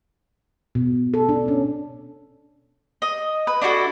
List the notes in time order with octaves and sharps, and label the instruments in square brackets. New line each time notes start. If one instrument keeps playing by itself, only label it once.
[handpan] B2
A4
D4
C#4
[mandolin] D#5
B4
D4 E4 F#4 A4